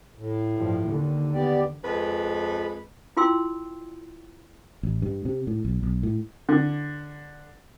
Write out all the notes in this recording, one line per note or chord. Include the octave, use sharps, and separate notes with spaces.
A2
G2 F3
D#2 D3
B3 G4 D5
F2 G#3 B4
E4 F4 G5 C6 E6
A1
G2
C3
A2
B1
B1
A2
D3